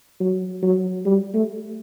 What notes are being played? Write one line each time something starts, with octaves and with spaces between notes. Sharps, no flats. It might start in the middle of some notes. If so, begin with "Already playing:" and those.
F#3
F#3
G3
A3